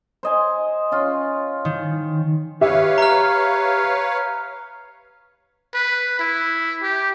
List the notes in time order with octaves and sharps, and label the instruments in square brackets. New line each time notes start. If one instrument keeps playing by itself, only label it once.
[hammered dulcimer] C5 D#5 G#5
C#4 F4
[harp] D#3
[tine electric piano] G4 [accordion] B4 C#5 F5 [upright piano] E5
[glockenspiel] A#5 F6
[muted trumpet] B4
E4
G4